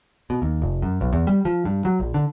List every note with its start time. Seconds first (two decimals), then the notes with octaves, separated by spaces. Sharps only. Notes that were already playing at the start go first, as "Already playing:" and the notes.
0.30 B2
0.42 D#2
0.62 F1
0.82 F#2
1.01 B1
1.13 E2
1.27 G3
1.45 F3
1.65 G2
1.85 F#3
2.00 A#1
2.14 D3